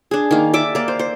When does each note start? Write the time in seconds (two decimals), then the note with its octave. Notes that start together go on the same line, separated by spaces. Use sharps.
0.11 D4 G#4
0.31 D#3 A#3
0.54 D5 E5 D6
0.75 A#3 D5
0.88 C5
0.99 C5